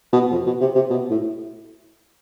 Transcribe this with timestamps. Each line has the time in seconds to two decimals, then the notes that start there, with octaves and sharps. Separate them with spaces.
0.13 B2
0.31 F2
0.46 B2
0.61 C3
0.75 C3
0.90 B2
1.10 A2